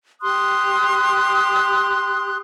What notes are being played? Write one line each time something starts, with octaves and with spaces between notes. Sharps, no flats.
G4 C6 D#6 F#6